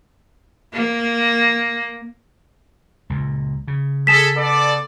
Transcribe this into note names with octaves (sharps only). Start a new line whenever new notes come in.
A#3
C#2 A#2
C#3
G#4 A4 B6 E7
B3 A4 D5